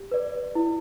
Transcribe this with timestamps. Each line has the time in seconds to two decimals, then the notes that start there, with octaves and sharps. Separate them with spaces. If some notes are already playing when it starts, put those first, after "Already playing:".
Already playing: G4
0.11 B4 D5
0.55 E4